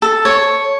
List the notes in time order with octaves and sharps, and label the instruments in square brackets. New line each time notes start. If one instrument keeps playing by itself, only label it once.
[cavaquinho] A4
C#5